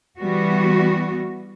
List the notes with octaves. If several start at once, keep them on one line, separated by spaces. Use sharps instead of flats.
E3 G3 B3 F#4